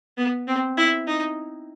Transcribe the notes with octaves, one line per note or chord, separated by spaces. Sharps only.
B3
C4
E4
D#4